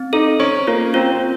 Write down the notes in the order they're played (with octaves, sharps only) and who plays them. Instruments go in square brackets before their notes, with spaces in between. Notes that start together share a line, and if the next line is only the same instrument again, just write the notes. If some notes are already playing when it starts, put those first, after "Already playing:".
Already playing: [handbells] C4
[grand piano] D#4 [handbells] A4
[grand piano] C#4 [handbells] C5
[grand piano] A#3 [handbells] F4
[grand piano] C4 [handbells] F4
[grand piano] C4